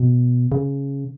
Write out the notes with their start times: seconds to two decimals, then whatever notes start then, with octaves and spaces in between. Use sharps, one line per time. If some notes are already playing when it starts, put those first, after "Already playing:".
Already playing: B2
0.52 C#3